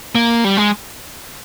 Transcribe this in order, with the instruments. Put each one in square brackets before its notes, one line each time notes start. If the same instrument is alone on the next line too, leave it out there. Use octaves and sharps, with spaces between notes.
[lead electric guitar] A#3
G3
G#3